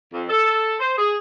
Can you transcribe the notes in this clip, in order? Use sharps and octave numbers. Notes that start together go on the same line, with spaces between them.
F2
A4
C5
G#4